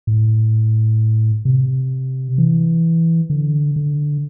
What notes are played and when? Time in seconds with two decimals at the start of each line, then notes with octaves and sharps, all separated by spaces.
0.07 A2
1.45 C3
2.38 E3
3.30 D3
3.76 D3